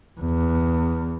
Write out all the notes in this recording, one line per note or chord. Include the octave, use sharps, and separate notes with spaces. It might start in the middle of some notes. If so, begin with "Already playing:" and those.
E2